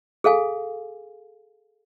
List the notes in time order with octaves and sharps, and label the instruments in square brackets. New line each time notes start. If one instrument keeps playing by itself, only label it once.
[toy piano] G#4 A4 F5 G#5